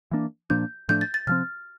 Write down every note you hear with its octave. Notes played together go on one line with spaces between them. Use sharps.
E3 A#3 D4
A#2 F3 A#3 D4 G6
A2 F3 A3 D4 G6
A6
A6
C3 F3 C4 F6